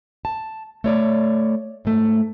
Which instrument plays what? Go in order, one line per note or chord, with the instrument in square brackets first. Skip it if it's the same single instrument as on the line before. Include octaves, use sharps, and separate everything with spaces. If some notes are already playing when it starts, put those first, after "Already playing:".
[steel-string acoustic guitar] A5
A3 C#5 D5
G#2 A3